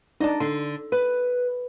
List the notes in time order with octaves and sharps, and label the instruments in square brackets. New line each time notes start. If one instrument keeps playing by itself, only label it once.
[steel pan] D4 D#4 D5 [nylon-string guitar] D#5 A5
[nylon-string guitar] D3 [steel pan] C6
[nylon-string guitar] B4